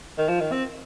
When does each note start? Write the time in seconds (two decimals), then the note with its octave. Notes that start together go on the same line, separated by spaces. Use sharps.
0.18 D#3
0.29 F3
0.40 D#3
0.52 C4